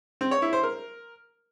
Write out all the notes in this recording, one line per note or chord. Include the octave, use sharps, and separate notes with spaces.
C4
C#5
E4
C5
A#4